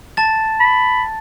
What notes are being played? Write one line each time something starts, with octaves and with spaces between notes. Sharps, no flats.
A5 A6
B5